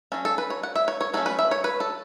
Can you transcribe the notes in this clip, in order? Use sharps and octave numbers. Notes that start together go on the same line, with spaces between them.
F#3 C#4 A4
A4
B4
C#5
F#5
E5
C#5
C#5
F#3 A3 C#4 A4
B4
E5
C#5
B4
A4